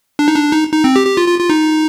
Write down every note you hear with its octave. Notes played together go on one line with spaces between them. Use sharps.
D4
D#4
D4
D#4
D#4
C4
G4
G4
F4
F4
F4
D#4